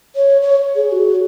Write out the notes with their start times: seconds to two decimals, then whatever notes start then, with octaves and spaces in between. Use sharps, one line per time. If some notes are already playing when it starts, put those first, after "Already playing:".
0.16 C#5
0.42 C#5
0.75 G#4
0.92 F#4